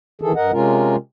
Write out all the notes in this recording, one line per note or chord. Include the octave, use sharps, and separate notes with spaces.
D#3 E3 G#4 A4
G2 A#4 D#5 F#5
C3 G#3 C#4 F4 A#4